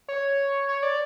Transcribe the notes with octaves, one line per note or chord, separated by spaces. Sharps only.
C#5
C#5
D5